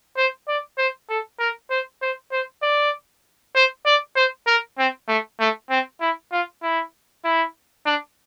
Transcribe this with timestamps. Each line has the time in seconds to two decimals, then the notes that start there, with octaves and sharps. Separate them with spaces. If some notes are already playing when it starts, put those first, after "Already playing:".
0.17 C5
0.48 D5
0.78 C5
1.09 A4
1.40 A#4
1.70 C5
2.02 C5
2.32 C5
2.62 D5
3.55 C5
3.86 D5
4.16 C5
4.47 A#4
4.78 C4
5.08 A3
5.40 A3
5.70 C4
6.01 E4
6.32 F4
6.63 E4
7.24 E4
7.86 D4